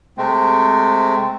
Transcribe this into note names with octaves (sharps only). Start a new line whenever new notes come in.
C3 G#3 A3 C4